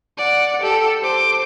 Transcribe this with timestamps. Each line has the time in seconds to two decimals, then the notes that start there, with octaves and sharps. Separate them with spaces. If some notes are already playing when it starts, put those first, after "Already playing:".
0.18 D5 F#5
0.62 G4 A4
1.02 C5 D6